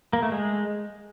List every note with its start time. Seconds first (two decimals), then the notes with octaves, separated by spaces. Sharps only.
0.13 A#3
0.23 A3
0.32 G#3